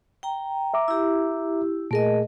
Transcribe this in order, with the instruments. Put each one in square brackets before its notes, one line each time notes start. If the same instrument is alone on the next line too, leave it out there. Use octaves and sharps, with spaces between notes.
[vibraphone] G5 A#5
[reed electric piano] E5 A#5 D6
[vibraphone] E4 G4
[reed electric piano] A#2 G#4 [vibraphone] A3 A#4 D#5